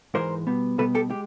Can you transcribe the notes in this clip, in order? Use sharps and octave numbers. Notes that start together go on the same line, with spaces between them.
G#2 E3 G#3 A#4 C5
B2 G3 B3
B2 G3 B3 A4 B4
G4 A4
G#3 G4